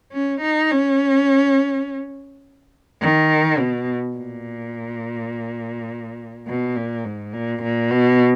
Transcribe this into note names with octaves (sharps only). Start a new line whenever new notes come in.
C#4
D#4
C#4
D#3
B2
A#2
B2
A#2
G#2
A#2
A#2
B2